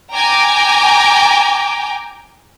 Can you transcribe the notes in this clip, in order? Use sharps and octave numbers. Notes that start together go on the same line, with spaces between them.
G5 G#5 A#5 D6